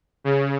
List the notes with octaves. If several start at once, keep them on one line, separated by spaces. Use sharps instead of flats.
C#3